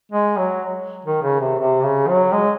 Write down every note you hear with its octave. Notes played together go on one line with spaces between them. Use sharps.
G#3
F#3
D#3
C#3
C3
C3
C#3
F#3
G#3